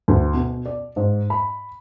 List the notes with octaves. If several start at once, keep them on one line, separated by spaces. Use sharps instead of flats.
D2
B2
D5
G#2
B5